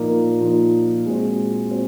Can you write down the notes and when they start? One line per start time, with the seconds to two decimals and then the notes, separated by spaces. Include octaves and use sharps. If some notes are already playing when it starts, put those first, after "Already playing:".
Already playing: A#2 F3 A#3 D#4 A#4
0.40 A#2 F3 A#3 D#4 A#4
1.06 A#2 G#3 C4 F#4 C5
1.71 C4 F#4 C5